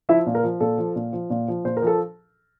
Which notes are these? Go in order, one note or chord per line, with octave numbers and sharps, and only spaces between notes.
F3 E4 E5
A#2
A#4
F3
A#2 A4
F3
A#2
F3
A#2
F3
A#2 C5
A#4
F3 A4